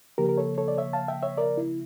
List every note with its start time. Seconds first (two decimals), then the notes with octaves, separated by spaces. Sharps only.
0.18 C#3 F3 A#3 G4 A#4
0.29 A#4
0.37 A4 C#5
0.58 A4 C#5
0.68 D5
0.78 C#5 E5
0.93 F5 A5
1.08 E5 G5
1.23 C#5 E5
1.37 A#4 D5
1.57 E4